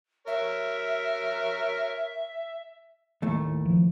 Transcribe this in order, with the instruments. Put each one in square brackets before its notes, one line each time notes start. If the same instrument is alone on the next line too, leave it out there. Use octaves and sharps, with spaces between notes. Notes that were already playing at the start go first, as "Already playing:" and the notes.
[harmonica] A#4 C#5 [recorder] E5
[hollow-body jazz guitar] D#2 A2 A3
[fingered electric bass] F3